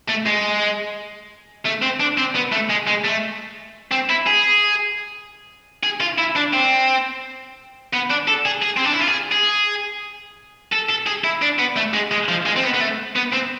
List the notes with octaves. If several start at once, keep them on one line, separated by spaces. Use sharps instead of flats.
A3
G#3
A3
C4
D4
C4
B3
A3
G#3
G#3
A3
C4
E4
G#4
G#4
F4
E4
D4
C4
B3
D4
A4
G#4
G#4
C4
D4
E4
F4
G#4
G#4
A4
A4
G#4
E4
D4
B3
A3
G#3
G#3
F3
G#3
C4
B3
B3
A3
B3
C4